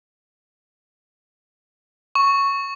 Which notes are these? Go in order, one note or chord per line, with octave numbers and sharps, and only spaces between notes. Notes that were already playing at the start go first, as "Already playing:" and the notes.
C#6